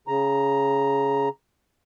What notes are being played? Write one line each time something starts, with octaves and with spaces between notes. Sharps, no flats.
C#3 A#5